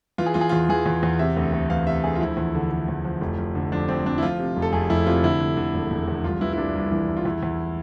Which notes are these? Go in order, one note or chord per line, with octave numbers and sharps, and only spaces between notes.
E3 F4
G#4
E3 F4
G#4
E2 F4
E3 G#4
E2
E2
C3 E5
D2
D2
E3 F5
C3 E5
D2 G#4
F4
F3 E4
E2
D3
D3
E2
F3
F1
F3
D3
F3 D4
F2 C4
F2 D4
E4
F3 F4
C3
F1
A4
F1 G#4
F1 E4
C3 F4
D3 E4
D3
D3
E1
E1
E2
C2 F4
E3 E4
E4
C2 D4
C2
E3
C2
F4
E2 E4
E2